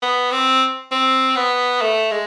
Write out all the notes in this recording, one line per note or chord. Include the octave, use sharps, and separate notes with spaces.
B3
C4
C4
B3
A3
G#3